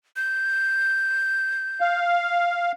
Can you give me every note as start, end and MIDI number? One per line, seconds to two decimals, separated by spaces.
0.16 2.00 91
1.81 2.72 77